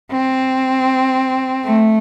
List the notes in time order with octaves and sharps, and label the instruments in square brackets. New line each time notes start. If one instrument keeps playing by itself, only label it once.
[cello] C4
A3